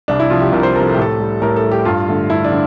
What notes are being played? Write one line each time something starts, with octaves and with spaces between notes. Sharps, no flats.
C2 D4
E4
C3 F3 F4
G4
C2 A#4
C5
C3 F3 A#4
A4
G4
A2 A4
G3
A2 A#4
A4
G3
G4
G2 F4
D3 A3
G2 E4
D4
D3